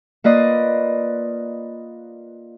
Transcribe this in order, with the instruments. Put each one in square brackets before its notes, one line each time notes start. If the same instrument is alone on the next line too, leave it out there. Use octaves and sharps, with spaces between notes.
[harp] A#3 F4 B4 D5 D#5